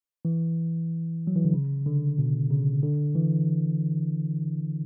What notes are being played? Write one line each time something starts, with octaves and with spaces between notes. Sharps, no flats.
E3
F#3
E3
D3
C#3
D3
B2
C#3
D3
E3